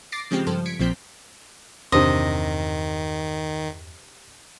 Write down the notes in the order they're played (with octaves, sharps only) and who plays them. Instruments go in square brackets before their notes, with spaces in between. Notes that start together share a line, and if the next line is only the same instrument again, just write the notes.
[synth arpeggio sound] D6 A6 A#6 C7 D7
C#3 F3 G#3 C4 G4
G2 F3 A4 C5
G#6 B6 C#7 D7
A#1 A#2 F3 C4 G6 B6
[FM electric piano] E2 G2 [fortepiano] C3 D4 C5 [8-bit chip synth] D#3 [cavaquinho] D#5